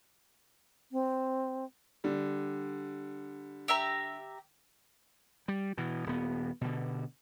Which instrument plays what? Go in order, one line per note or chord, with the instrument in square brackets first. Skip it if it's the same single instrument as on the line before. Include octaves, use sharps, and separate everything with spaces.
[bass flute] C4
[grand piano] D3 G3
[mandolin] G4 E5 A#5
[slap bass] G3
B2 E3
D#1 B3
B2 D3